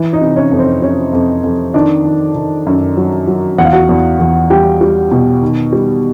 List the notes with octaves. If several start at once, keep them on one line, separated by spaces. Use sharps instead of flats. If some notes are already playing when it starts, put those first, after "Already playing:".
Already playing: E3
D#4 D#5
C3
C#4 C#5
F2
C4 C5
C3 C#4 C#5
F2
F2
D#3 D4 D5
D#3
D#3
F#2
F#3
F#3
E2 F#5
F5
F#4 F#5
E2
E2
G3 G4 G5
G3
B2
D#3
G3